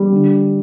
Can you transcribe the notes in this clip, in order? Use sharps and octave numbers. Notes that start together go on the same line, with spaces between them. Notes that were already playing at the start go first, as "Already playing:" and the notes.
Already playing: G3
D3